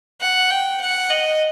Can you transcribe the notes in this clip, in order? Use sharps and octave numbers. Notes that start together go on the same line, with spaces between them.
F#5
G5
F#5
D#5